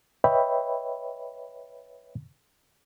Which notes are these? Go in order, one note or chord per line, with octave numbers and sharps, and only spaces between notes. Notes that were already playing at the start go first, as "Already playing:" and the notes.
B4 C#5 D#5 E5 G5 B5